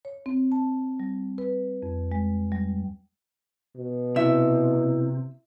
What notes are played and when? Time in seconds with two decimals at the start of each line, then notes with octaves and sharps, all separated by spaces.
0.05 C#5
0.26 C4
0.52 A5
1.00 G3
1.38 B4
1.83 F2
2.12 G#3
2.52 G3
3.77 B2
4.16 C3 E4 E5